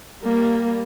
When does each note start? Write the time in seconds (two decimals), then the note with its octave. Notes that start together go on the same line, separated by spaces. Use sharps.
0.22 G3 A#3